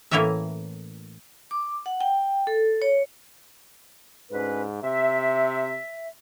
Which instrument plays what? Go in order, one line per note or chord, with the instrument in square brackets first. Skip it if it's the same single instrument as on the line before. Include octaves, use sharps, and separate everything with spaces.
[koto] A2 E3 A#3 C#4 A#4 E5
[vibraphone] D6
F#5
G5
A4
C#5
[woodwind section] D2 C#4 B4 [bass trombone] G#2
[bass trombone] C3 [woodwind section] E5